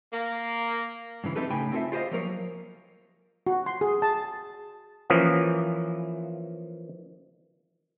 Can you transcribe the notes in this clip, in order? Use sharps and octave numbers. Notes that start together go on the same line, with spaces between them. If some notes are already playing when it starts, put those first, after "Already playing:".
A#3
G2 C#3 E3
C4 D#4 E4 G4 A4 B4
A2 C#3 D#4 G5 G#5 B5
C4 F4 G#4 A4 E5
F4 G4 C5 D#5 F5
F3 F#3 A#3 A#4 C#5
F#4
C6
G#4
A5
E3 F3 A#3 C#4